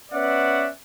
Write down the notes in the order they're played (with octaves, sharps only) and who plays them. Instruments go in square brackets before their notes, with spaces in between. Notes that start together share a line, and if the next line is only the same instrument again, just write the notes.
[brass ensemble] B3 C#4 D5 E5 F#5